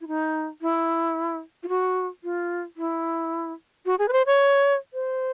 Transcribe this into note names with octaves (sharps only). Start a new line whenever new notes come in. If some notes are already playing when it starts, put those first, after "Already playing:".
E4
D#4
E4
F4
F#4
F4
E4
F#4
G#4
B4
C5
C#5
C5